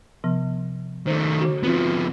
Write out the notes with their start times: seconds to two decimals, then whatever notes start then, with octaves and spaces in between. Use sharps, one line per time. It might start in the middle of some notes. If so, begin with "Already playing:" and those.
0.24 C3 F3 B3
1.07 D#3 A3 C5
1.41 D3 F#4
1.63 F3 B3 C4 F4